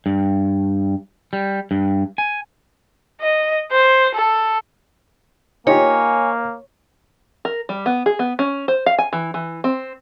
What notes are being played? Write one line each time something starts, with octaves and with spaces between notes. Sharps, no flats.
G2
G3
G2
G#5
D#5
C5
A4
A#3 D#4 F4 G4 C#5 G#5
A#4
G3
B3
G#4
B3
C#4
C5
F5
G#5
E3
E3
C4